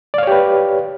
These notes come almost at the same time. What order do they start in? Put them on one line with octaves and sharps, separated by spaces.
D5 F5 C#5 G4 B4